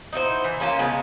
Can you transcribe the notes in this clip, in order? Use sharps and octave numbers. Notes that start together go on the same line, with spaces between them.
D#4 E4 F#4 C5
E3
A#3 C#4 F4 C5
C#3 F3 G#3 B3